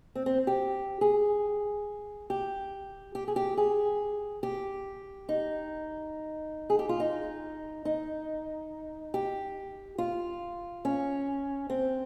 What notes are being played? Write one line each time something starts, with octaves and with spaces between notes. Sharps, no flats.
C4
C4
G4
G#4
G4
G4
G#4
G4
G#4
G4
D#4
G#4
G4
F4
D#4
D#4
G4
F4
C#4
C4